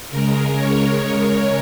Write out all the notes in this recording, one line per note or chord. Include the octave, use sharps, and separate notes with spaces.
C#3 G#3 A#4
C#5